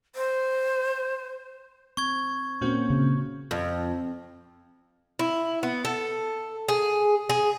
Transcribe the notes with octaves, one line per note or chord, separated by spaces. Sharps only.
C5
C4 C#6 G#6
A#2 A#3 C4 C#4 F#4
C#3
F2
E4
B3
A4
G#4
G#4